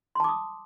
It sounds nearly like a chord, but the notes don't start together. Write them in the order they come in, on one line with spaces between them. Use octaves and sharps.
C6 A5 D6 D#6